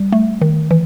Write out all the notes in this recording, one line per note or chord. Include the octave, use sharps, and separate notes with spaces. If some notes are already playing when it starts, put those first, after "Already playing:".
Already playing: G3
A3
D#3
E3